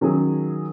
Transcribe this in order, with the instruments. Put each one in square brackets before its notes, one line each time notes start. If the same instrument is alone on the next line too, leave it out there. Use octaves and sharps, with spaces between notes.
[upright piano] D#3 F#3 C#4 G#4